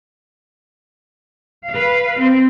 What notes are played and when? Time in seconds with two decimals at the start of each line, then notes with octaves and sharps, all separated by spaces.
1.68 B4 F5
2.18 C4